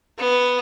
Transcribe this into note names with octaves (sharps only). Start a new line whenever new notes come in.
B3